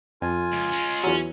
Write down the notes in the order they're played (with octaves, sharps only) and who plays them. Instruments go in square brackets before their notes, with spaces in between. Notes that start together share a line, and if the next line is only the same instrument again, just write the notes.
[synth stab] F2 [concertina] F4 G#5
[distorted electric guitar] C#2
G#3 C#4
[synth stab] E2 F#3 [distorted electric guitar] C#4